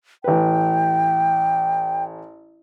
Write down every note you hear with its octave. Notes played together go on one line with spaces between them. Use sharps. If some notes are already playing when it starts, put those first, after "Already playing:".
A1 B4 G5